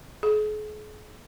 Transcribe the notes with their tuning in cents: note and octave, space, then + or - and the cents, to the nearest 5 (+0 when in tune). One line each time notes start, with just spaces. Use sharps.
G#4 +45